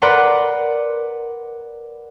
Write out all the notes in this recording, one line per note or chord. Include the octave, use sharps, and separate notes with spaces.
A#4 B4 D5 F#5 A#5 C6